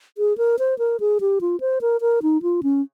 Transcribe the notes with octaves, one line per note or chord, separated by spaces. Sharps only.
G#4
A#4
C5
A#4
G#4
G4
F4
C5
A#4
A#4
D#4
F4
C#4